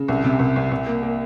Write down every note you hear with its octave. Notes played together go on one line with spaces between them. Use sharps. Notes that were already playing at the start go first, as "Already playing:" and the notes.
Already playing: C#3
C2
C3
C2
C2
C2
A#3
A#3